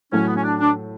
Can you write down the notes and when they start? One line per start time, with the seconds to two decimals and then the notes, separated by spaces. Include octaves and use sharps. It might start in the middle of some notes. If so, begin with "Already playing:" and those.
0.12 A2 F#3 A3 C#4
0.28 B3
0.36 C#4
0.43 D4
0.59 D4